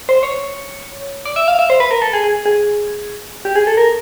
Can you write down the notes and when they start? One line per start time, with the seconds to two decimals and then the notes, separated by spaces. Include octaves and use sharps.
0.09 C5
0.23 C#5
1.25 D5
1.36 E5
1.48 F5
1.59 E5
1.70 C5
1.80 B4
1.91 A#4
2.02 A4
2.13 G#4
2.24 G#4
2.46 G#4
3.45 G4
3.56 G#4
3.67 A4
3.77 A#4